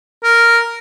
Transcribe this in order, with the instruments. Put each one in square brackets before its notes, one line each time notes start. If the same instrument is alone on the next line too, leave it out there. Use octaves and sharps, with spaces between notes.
[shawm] A#4